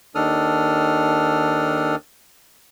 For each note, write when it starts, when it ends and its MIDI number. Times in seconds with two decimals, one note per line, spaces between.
0.15 1.96 39
0.15 1.96 51
0.15 1.96 62
0.15 1.96 69
0.15 1.96 87
0.15 1.96 89